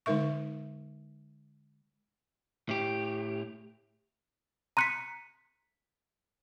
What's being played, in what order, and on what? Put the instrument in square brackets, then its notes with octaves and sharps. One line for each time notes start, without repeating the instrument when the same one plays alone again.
[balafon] D3 G#3 D#4 A#4 E5 C#6
[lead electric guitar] A2 G4
[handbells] A#5 C6 F#6 [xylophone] B6 C#7 D#7